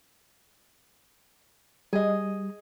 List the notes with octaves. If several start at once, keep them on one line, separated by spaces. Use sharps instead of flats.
G3 G#4 D#5